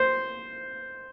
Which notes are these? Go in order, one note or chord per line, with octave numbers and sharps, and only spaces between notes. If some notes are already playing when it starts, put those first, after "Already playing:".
Already playing: C5